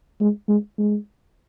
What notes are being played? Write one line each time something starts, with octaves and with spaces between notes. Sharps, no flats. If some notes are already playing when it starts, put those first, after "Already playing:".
G#3
G#3
G#3